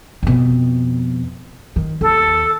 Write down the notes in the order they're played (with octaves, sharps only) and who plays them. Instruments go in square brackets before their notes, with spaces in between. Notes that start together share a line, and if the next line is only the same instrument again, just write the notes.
[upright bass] F2 B2
D#3
[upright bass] D#2 [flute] A4